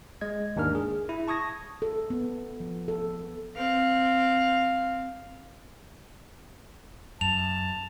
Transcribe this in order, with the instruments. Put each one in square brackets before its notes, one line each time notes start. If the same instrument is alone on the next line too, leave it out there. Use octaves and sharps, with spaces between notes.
[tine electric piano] G#3 D#5 G#6
D#2 G#2 D4 A#4 F6
G#4
E4
A5 C#6 D#6 G#6 A#6
[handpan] A4
B3
F3
A4
[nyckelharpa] C4 F5
[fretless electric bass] F#2 [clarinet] A5 [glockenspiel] F7